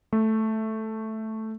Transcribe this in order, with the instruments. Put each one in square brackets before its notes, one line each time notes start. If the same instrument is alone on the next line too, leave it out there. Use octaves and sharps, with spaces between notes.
[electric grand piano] A3